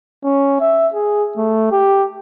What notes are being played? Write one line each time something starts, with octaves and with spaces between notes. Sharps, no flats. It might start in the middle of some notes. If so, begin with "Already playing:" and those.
C#4
E5
G#4
A3
G4